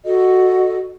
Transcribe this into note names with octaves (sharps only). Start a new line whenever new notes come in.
F#4 A4 D#5